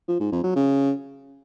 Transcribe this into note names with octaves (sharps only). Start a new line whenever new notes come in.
F3
G#2
F2
F#3
C#3